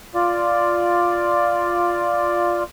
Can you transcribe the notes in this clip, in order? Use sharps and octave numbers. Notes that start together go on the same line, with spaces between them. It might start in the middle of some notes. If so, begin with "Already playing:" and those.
F4 D5